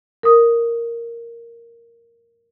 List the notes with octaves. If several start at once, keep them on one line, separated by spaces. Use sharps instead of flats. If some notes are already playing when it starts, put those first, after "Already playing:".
A#4 D#6